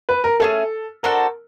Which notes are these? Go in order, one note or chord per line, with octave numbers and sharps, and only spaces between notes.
B4
A#4
A3 C#4 F4 G#4 A4
D4 F#4 A4 A#4 C5